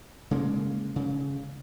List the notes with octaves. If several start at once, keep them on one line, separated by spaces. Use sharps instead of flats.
C#3 G#3 A#3
C#3